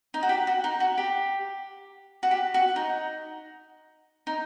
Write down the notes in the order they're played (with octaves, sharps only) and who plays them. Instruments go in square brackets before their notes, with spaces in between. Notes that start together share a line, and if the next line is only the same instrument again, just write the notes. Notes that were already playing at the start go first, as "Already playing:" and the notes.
[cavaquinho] D#4
F#4
G4
F#4
D#4
F#4
G4
F#4
G4
F#4
D#4
D#4